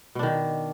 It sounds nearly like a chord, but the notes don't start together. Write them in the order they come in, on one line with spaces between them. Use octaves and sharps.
B2 D4 D#3